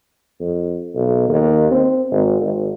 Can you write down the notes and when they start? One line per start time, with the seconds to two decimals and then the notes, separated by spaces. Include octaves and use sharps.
0.40 F2
0.95 B1
1.29 D#2
1.71 C4
2.11 G#1
2.40 G#1